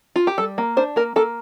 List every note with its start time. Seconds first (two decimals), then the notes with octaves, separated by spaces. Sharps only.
0.16 F4
0.27 G4
0.38 G3 A4
0.58 A#3
0.77 D4 C5
0.96 A#3 A#4
1.16 A#3 A4